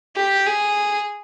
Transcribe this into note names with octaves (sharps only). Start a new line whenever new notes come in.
G4
G#4